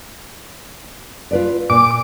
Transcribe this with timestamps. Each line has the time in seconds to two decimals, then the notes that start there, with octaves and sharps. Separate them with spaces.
1.31 F4 B4 D5
1.70 A#2 D6